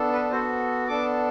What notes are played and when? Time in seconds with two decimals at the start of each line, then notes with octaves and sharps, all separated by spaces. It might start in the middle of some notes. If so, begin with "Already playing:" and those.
Already playing: B3 D4 A4
0.13 B4
0.31 B3 F#4 A4 C5
0.88 B3 D4 A4 D6